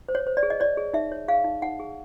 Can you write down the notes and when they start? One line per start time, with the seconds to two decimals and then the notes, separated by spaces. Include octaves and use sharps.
0.09 C5
0.15 C#5
0.27 C5
0.37 D5
0.43 G#4
0.50 D#5
0.60 C#5 D5
0.77 G#4
0.93 D#4 E5
1.11 C#5
1.28 G#4 F5
1.44 D#4
1.62 D#4 F#5
1.79 G#4